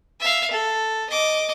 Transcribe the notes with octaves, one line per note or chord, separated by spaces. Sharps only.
E5 F5
A4
D#5 D6